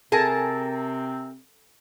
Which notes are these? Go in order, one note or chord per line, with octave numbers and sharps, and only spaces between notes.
C3 C4 G#4 A#4 G#5 A5